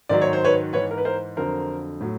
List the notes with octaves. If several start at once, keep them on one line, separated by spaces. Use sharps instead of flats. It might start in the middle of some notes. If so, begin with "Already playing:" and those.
G#2 D#3 F#3 D5
C#5
C5
B4 C#5
G#2 E3 B4 C#5
A#4
B4
A#4 C5
F2 D3 F#3 A#4 C5
A2 F#3